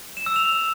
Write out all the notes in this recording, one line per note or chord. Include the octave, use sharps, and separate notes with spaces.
E7
E6
F7